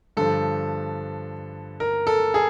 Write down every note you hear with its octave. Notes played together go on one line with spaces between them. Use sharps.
G2 D3 F3 A4
A#4
A4
G#4